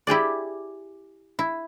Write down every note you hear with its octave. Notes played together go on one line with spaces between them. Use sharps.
E4 G4 G#4 D5
E4